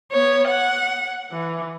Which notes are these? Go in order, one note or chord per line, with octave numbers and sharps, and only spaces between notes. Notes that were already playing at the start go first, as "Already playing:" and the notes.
B3 C#5
F#5
E3